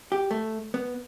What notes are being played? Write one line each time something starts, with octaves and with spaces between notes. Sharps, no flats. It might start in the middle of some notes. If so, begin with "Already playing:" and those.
G4
A3
B3